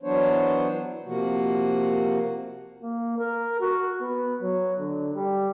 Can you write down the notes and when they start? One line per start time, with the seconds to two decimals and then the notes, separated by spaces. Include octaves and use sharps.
0.03 E3 F#3 B3 D4 C5 C#5
1.05 C3 F3 A#3 F#4
2.82 A#3
3.18 A#4
3.61 F#4
4.01 B3
4.42 F#3
4.79 D3
5.15 G3